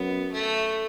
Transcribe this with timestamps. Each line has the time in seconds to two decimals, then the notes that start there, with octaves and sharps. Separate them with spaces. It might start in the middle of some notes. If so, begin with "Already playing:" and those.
Already playing: F#2 B3
0.32 A3